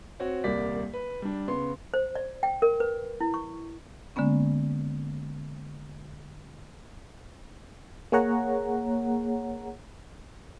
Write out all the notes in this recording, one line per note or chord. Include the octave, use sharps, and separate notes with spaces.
C4 F#4 C#5
D#1 C2 A#3 D5 B6
B4
G3 D4
C#3 B3 C6
C5
D5
G5
A#4
B4
E4
C#6
D3 G#3 A#3 B3 C#4
A#3 G#4 C#5 F#5 A#5